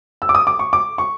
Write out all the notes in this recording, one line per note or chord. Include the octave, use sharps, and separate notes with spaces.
E6
D6
D#6
D6
C#6
D6
C#6